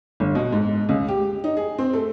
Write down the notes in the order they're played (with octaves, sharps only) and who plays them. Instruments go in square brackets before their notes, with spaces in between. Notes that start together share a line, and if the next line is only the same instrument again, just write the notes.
[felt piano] G1
B2
G#2
C#2
G4
D#4
G#4
C4
A3